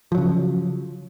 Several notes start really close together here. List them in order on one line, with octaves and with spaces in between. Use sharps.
F3 F#3 C#3